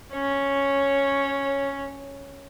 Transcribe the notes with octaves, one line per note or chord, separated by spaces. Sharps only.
C#4 C#5